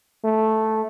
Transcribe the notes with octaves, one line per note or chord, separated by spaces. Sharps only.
A3